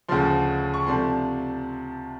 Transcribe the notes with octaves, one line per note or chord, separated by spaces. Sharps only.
D2 C#3 F3 C6
C#6
C3 F3 A3 D4 C6